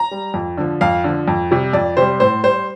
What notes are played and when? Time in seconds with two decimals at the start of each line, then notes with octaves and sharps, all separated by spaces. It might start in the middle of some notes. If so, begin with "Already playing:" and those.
Already playing: A#5
0.11 G3
0.34 F2
0.58 D3 F3
0.81 F2 F5
1.04 D3 F3
1.28 F2
1.51 C3 G3
1.73 F2 D5
1.97 C3 G3 C5
2.20 A2 C5
2.44 G3 C5